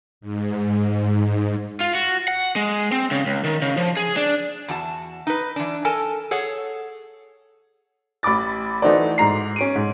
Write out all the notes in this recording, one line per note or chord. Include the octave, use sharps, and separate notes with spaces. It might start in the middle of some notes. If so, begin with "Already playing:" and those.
G#2
F4
F#4
F#5
G#3
C4
C#3
C#2
D#3
C#3
F3
G#4
D4
E2 F#4 A5
D#4 B4
E3 D4
A4 A#4 G#5 A5
G#4 A4 C#5 F#5
A1 B5 D6 A6
E3 A3 D#4 F#4 C5 D5
G#2 A#5 C7
C#4 D7 D#7
G#2